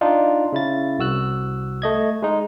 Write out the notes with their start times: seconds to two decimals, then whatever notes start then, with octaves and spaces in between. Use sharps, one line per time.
0.01 D4 D#4 F4
0.53 C#3 E4 A6
0.99 C2 F#4 E6 F#6
1.82 A3 D#5 G#6
2.22 G#3 D#4